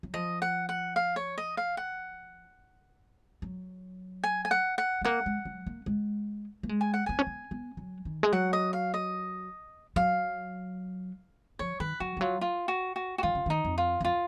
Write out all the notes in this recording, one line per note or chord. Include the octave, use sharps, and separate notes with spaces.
F#3
F3 D#5
F#5
F#5
F5
C#5
D#5
F5
F#5
F#3
G#5
G#5
F#5
F#5
G#3
A#3 F#5
G#3
F#3
A#3
G#3
A#3
G#3
G#5
F#5
B3 G#5
C#4
B3
B3
F#3
D#3
G#3
F#3 F#5
D#5
F5
D#5
F#3 F5
F3 C#5
D#3 B4
F#3 F#4
F3
F#3 F4
F4
F#4
F#4
F#4
D#3 F4
C#3
D#3 D#4
F2
F4
F2
F4